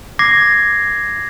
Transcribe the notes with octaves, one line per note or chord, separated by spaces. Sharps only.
D6 G#6 A#6 C7